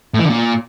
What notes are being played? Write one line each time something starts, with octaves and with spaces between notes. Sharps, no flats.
A2
E3
D3
A#2